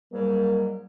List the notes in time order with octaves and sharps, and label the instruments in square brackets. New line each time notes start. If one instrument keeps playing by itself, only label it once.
[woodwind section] G#2 F#3 G3 [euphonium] A#3